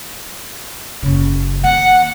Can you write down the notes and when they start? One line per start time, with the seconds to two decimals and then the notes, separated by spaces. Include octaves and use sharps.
1.03 F#1 C#3
1.64 D#3 A#3 F#5